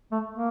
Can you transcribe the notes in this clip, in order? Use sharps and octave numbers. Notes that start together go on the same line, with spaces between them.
A3
A#3